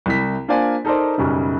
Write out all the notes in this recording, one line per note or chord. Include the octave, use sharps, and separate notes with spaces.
C2 E4 B6
A#3 D4 F4 C5 D5 G#5
D#4 A4 A#4 C5 D5
B1 F#2 C#3 G3